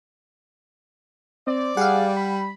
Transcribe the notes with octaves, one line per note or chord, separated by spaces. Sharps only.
C4 D5
G3 G#4 F5 F#5
B5